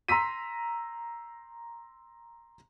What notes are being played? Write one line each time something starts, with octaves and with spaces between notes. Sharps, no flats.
A#5 C6 E6 B6 D#7